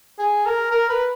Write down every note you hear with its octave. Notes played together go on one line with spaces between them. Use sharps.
G#4
A#4
A#4
B4